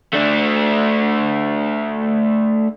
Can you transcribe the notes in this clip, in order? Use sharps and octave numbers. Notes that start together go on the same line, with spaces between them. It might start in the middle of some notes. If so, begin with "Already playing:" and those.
A3 D4